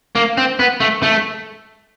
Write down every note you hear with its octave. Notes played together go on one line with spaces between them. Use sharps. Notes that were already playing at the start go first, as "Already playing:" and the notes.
A#3
C4
B3
A3
A3